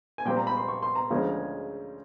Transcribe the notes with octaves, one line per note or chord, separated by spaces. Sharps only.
G#5
A#2 G3 C4 G5
A#5
B5
C6
C#6
C6
A#5
D2 C#3 F3 G#3 C#4